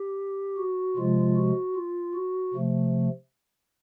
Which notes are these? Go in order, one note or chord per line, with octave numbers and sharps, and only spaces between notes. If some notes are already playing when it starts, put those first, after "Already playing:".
Already playing: G4
F#4
C3 F3 G#3 F4
F#4
F4
F#4
C3 F3 A3